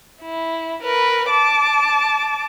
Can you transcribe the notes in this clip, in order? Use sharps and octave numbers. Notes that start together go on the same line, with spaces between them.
E4
A#4 B4
A5 D6